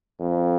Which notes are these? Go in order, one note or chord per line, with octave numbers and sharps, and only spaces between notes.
F2